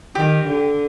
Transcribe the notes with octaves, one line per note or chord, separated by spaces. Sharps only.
D#3 G4
D3